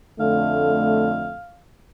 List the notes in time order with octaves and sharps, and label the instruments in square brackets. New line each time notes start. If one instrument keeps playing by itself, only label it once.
[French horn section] F2 D3 A3 [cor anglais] F5